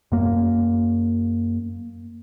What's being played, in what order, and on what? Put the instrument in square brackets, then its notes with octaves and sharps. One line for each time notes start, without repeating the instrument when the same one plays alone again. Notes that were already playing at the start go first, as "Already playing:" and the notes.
[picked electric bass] F#2 A#3